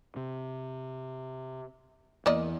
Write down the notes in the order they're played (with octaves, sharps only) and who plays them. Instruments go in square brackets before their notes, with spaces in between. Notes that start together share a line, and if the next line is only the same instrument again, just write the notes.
[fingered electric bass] C3
[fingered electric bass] E2 E3 [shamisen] A#3 D5 D#5